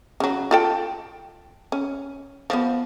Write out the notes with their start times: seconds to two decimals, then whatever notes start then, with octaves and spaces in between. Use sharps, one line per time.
0.20 C#3 F#3
0.51 F4 A4 G5
1.72 C#4
2.50 F3 B3